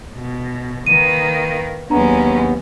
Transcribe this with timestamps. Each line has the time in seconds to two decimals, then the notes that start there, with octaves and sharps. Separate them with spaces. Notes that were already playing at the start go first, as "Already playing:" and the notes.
0.14 B2
0.86 D#3 A#3 B4 D#7
1.90 D#2 F#3 G#3 B3 C#4 D4 A#5